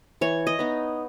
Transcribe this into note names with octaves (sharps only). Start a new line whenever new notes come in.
E3 C#5
D#5
B3 D#4